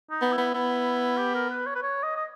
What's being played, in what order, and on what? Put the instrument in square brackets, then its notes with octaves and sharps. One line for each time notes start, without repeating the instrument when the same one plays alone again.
[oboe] D#4
[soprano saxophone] B3
[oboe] E4
[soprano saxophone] B3
[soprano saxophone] B3 [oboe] E4
[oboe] G4
A#4
B4
C#5
B4
C#5
D#5
D#5